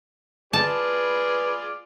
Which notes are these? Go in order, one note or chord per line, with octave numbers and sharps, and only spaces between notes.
F4 G#4 B4 D5 A5